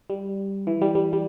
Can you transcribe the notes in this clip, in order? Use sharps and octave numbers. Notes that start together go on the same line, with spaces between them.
G3
E3
G3
G3
G3